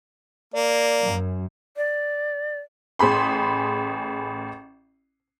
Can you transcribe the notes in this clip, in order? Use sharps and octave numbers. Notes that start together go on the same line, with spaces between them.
A#3 D5
F#2
D5
A1 G#4 B5 C6